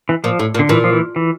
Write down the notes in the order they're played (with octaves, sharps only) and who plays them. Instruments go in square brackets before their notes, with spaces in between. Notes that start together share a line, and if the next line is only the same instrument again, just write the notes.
[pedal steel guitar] E3
[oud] A#2 [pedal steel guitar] F3
[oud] A2
A#2
[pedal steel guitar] D3
[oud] A#2 [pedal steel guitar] E3
[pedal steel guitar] F3
E3
E3